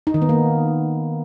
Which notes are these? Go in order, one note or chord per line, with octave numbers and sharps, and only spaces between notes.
D#4
D#3
B3
A#3